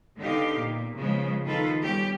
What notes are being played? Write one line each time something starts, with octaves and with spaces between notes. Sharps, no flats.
D3 B3 D#4 G4 F5
A#2
C#3 F3 G#3 B3
D#3 F4 A4 B4
G3 B3 C#4 G4